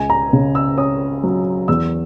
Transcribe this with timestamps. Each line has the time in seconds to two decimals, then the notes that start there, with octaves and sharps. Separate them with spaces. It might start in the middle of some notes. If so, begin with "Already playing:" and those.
Already playing: C#2 G#5
0.10 A#5
0.33 C#3
0.55 E6
0.77 C#4 D#6
1.23 F#3
1.68 E2 E6